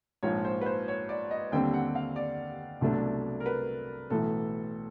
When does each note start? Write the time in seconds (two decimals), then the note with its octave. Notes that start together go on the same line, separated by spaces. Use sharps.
0.23 A#1 G#2 F3 C#5
0.45 C5
0.61 B4
0.66 C5
0.88 C#5
1.09 D5
1.31 D#5
1.52 D#2 D3 G3 C4 G5
1.74 F#5
1.95 F5
2.16 D5
2.81 C2 B2 F#3 A3 D4
3.40 A#4
3.46 B4
4.10 B1 A2 E3 A4